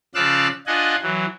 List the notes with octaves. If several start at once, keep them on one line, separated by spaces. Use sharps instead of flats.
C#3 F3 D5 F5 E6 F#6
D4 F4 D#5 F#5 G#5
E3 F#3